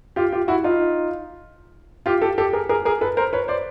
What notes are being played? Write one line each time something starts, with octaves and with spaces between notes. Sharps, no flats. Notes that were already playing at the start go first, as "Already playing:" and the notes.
F4 G4
F4 G4
E4 F#4
D#4 F4
F4 G4
G4 A4
G4 A4
G#4 A#4
G#4 A#4
G#4 A#4
A4 B4
A#4 C5
B4 C#5
C5 D5